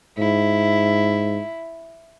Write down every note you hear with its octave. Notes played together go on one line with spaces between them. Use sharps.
G#2 E4